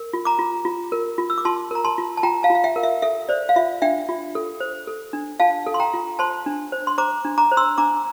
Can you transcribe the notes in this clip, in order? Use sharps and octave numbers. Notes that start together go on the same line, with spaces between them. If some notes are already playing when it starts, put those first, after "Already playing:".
Already playing: A#4
F4
A#5 D6
F4
F4
A#4
F4
E6
D6
F4 A5 C6
A#4 A#5
A5 C6
F4
A5
F4 G5 A#5
F5 A5
F4
F5
E5 G5
A#4
E5
A4 E5
C5 D5
F5
F4 E5
D4 E5 G5
F4
A4
C5
A4
D4
F4 F5 A5
A4
C6
G5 A#5
F4
C5 A5 C6
D4
C5
C6
C5 A#5 D6
D4
A#5 D6
C5
C6 E6
D4 A#5 D6